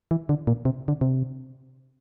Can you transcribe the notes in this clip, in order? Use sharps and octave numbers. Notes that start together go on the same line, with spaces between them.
E3
D3
A#2
C3
D3
C3